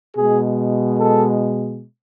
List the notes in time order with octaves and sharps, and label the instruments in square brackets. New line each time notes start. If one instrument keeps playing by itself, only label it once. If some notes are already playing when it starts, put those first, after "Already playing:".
[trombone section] B2 G#3 G#4
A4